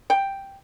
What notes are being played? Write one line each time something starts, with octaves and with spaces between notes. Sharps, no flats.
G5